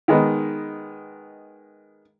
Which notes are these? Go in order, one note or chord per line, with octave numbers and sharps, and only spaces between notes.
D#3 G#3 B3 D#4